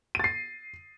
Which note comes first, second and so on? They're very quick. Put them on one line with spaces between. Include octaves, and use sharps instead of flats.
D#7 A6 C7